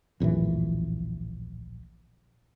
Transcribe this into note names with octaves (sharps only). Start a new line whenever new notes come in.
D1 A#1 F#2 E3